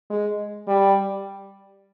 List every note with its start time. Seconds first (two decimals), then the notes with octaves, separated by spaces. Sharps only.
0.10 G#3
0.68 G3